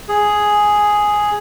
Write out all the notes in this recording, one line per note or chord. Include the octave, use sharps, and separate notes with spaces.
G#4